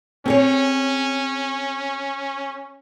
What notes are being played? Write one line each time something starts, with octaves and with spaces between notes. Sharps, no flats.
C4 C#4 G#4 C#5